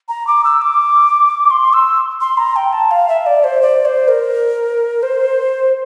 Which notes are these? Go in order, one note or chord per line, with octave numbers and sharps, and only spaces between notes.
A#5
D6
E6
D6
C6
E6
C6
A#5
G5
A5
F5
E5
D5
C5
D5
C5
A#4
C5